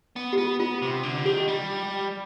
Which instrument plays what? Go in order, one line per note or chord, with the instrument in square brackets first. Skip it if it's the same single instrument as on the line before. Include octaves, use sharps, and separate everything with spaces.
[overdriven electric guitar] B3
[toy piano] G4
[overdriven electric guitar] B3 [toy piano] F4
[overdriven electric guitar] B3 [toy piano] F4
[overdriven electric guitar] C3
D3
[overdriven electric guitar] D#3 [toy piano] G4
[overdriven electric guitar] G3